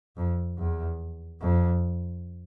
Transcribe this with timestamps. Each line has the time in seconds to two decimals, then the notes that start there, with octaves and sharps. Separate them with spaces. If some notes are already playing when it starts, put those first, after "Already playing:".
0.17 F2
0.58 E2
1.41 F2